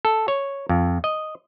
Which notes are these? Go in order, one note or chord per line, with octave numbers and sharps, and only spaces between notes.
A4
C#5
F2
D#5